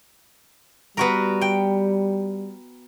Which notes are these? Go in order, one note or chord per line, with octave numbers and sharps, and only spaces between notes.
G3 B3 F#4 A#4
G5